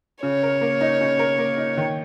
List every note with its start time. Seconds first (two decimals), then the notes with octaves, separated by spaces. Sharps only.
0.23 C#3 C#5
0.43 A#4
0.61 A#3
0.81 D#4
1.01 C#3
1.19 A#4
1.38 A#3
1.58 D#4
1.77 D#3